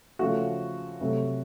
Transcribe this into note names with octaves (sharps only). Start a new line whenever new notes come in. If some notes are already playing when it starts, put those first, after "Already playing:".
C#3 F3 A3 F#4
C3 F#3 A3